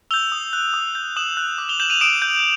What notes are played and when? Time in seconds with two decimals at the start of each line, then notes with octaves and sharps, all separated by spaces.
0.11 E6 G6 F7 G7
0.32 D#6
0.53 F#6
0.74 D#6
0.95 G6
1.16 D#6 E7 F#7
1.37 F#6
1.58 D6
1.69 F7 G7
1.80 G6 E7 F#7
1.90 D#7 F7
2.01 D#6 D7 E7
2.22 G6